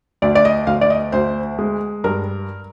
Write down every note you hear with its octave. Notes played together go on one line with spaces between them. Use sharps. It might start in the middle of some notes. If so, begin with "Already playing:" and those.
D2 D5
D5
D#5
D2 F5
D5
D#5
D2 C5
G#3
G2 A#4